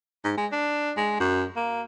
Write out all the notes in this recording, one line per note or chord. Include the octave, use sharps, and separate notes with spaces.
G#2
G#3
D4
G#3
F#2
A#3